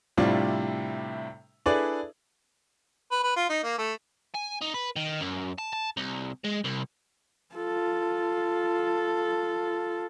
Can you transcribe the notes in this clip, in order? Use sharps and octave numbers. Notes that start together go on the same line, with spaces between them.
A2 C3 G3 D4 E4 F4
D4 E4 G#4 A4 B4 D5
B4
B4
F4
D#4
A#3
A3
G#5
D#4
B4
D#3
F#2
A5
A5
C2
G#3
C2
F4 A4